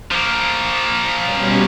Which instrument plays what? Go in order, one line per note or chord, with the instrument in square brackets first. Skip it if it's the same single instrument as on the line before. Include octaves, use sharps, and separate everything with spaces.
[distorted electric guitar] F3 A#3
[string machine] B2 G3 C#4